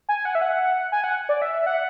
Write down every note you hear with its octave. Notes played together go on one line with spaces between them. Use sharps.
G#5
F#5
E5
F#5
G#5
F#5
D5
E5
F#5